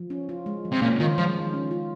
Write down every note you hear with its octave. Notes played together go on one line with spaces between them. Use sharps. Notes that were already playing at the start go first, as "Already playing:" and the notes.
Already playing: F3
C#4
F4
G#3
F3
C3
A#2 C#4
D#3 F4
F3 G#3
D#3
C#4
F4